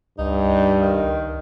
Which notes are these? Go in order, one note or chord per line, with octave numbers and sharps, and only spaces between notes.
C#2 G2 D#4
D#3